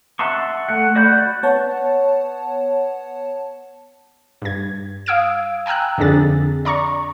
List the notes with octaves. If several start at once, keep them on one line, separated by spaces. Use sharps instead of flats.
E5 F#5 A5 C6 C#6
A3 F#5
F#4 D5 F#5 B5 G6
B3 C#5 F#5 A5
G2 G#6
F5 D#6 E6 G#6 D7
G5 G#5 A#5 E6 F#6
F2 D3 D4 G#4 A6
D5 A#5 C#6